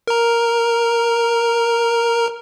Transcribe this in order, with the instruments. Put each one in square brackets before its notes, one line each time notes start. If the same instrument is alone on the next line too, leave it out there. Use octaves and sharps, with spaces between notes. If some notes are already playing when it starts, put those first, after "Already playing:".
[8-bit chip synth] A#4 A#5